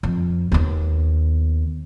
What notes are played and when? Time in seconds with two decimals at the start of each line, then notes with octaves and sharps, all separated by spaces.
0.03 F2
0.52 D#2 B3